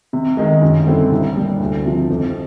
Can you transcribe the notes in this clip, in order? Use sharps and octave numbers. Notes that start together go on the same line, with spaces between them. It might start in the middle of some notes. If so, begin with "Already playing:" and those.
C3
D#3 G#3
F#2
D3 G3 C4 E4
C2
A#2 G3 A#3 D4
D2
C3 F3
F2